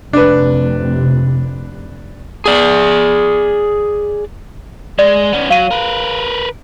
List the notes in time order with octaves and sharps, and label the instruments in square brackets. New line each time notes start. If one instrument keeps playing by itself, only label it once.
[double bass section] F1 C3 [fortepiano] D4 B4
[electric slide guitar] G#4 D5
[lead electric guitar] G#3 [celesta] D5
[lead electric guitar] B3 C#4
[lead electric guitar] F#3 [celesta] F5 D#7
[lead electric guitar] A#4 B4